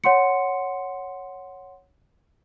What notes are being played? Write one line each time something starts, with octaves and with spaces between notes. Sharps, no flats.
C#5 F#5 C6 C#7